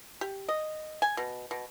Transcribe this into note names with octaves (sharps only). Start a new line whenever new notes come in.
G4
D#5
G#5
B2
B2